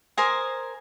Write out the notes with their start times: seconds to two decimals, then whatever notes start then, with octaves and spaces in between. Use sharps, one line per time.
0.17 A#4 C5 G#5 D#6